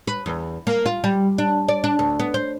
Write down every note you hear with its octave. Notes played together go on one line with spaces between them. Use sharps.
B4
E2
A#3
F4
G3
D4
D5
D4
D2
B3
C5